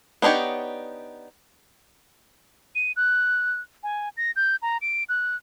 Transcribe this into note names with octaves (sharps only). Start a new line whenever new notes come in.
B3 D4 D#4 G4 C#5
D#7
F#6
G#5
A#6
G6
A#5
D7
F#6